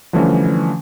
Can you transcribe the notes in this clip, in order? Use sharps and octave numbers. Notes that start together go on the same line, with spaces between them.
D3 E3 F3 G3 A3 C#4